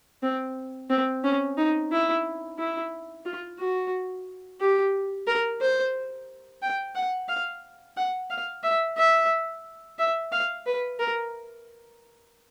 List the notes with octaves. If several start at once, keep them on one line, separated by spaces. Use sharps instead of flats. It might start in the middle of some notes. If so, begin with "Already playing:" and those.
C4
C4
C#4
D#4
E4
E4
F4
F#4
G4
A#4
C5
G5
F#5
F5
F#5
F5
E5
E5
E5
F5
B4
A#4